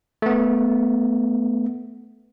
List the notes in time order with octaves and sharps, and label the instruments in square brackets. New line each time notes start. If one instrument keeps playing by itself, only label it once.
[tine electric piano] A3 B3